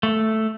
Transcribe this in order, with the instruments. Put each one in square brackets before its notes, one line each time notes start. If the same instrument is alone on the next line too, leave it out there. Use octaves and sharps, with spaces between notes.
[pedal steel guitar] A3